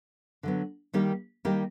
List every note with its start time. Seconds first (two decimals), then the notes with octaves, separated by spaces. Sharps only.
0.43 D3 F#3 B3
0.93 D#3 G3 A#3 D#4 G4
1.45 D#3 G3 A#3 D#4 G4